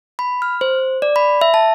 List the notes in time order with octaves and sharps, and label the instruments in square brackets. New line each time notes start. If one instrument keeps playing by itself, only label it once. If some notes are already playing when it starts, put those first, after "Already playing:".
[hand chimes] B5
F6
C5
D5
B5
E5
A5